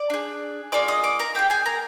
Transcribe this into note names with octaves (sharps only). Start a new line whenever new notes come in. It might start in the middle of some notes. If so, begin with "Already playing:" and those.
Already playing: D5 D6
D4 G#4
A#3 F4 G#4 D5 D6
D#5 D#6
D5 D6
A#4 A#5
A#3 F4 G4 G#4 G5
G#4 G#5
A#4 A#5